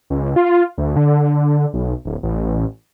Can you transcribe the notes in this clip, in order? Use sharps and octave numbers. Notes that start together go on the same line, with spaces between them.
C#2
F4
D2
D3
B1
D1
A1